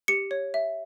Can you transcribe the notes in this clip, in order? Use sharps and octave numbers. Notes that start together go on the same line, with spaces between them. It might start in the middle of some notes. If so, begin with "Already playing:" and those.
G4 C#7
C#5
E5